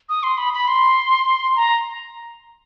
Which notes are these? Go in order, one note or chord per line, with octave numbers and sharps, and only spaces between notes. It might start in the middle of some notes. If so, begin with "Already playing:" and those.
D#6
C6
B5
B5
C6
A#5